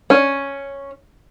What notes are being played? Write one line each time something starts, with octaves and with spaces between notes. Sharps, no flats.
C#4